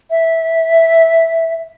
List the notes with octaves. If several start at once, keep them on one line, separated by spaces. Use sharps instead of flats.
E5